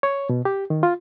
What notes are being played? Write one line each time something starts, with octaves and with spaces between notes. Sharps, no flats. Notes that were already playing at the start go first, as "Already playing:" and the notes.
C#5
B2
G4
D#3
F4